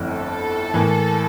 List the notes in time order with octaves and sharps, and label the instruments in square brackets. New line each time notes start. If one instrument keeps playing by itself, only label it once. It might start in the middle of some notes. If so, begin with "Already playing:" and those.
Already playing: [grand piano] G1 F2 D3 A3 E4
[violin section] A4
[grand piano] A2 E3 A#3